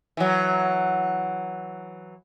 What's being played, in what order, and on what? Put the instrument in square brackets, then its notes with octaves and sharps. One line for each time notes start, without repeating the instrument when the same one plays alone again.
[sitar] E3 F#3